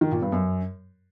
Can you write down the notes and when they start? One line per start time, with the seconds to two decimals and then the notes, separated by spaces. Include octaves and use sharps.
0.01 D#3
0.12 A#2
0.22 G2
0.32 F#2